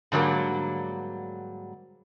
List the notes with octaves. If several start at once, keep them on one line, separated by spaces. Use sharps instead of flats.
G#2 D3 F#3 G3 A#3